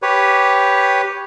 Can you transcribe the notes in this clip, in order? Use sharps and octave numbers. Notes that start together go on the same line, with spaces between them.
G4 B4 C#5